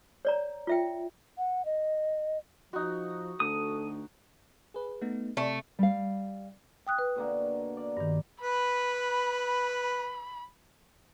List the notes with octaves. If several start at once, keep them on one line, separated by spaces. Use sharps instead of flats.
C#5 D5 A#5
F4 E5 G5
F#5
D#5
F3 D#4 F#4
D2 A4 D#6
G#4 B4
A3 B3 D#4
C3 A3
G3 F5
G5 D#6 F#6
B4
B2 D3 A#3
D5
G2 D#3
B4 B5